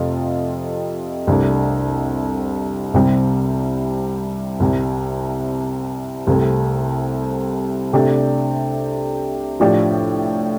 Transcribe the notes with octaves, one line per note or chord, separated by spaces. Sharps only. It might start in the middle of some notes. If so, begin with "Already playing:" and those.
Already playing: F2 C3 A3 F4
C2 C3 A3 D4
C2 C3 G3 C4 G4
C2 C3 G3
C2 C3 A3 C4
C3 A3 D4 G4 D5
A2 F3 D4 G4 D5